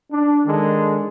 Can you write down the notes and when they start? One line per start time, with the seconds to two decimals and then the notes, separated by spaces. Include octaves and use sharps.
0.11 D4
0.45 D#3 G#3 D4 A4